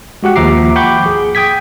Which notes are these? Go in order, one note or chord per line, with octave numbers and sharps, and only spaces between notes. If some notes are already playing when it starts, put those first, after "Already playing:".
G#3 F#4 G4 F#5
D#2 F3 E5 A#5 D6 C7
F#5 G5 B5 C#6 D6 G6
G#4
G5 D#6 G#6 B6